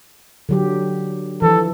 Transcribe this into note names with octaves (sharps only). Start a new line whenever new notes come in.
D3 F#3 G4
E3 F3 A4